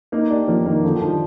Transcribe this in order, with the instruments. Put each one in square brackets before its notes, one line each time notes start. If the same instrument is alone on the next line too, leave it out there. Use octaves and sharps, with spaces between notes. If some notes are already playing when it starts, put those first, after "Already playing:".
[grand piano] A#3 [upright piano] D#4
[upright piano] D4 [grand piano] G4
[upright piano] F3 [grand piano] A#3
[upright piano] D#3 [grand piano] A#3
[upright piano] D3 [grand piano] F3
[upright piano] D#3
[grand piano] F3
[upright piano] G3